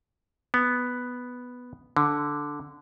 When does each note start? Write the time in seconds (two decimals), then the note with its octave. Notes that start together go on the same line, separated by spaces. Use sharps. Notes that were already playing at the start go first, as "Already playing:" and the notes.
0.54 B3
1.97 D3